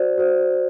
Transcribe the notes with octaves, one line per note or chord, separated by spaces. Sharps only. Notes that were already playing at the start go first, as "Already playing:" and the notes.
Already playing: F#4 C5 D5
F#4 C5